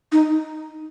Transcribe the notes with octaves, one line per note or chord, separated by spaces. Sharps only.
D#4